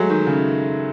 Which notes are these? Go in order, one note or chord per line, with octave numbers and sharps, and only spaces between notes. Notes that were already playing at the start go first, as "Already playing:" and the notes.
Already playing: F#3 G#3 A3
D#3
C#3